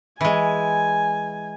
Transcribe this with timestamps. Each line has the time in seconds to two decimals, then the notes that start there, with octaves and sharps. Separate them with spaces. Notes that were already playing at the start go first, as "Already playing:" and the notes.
0.21 E3 G#3 G#5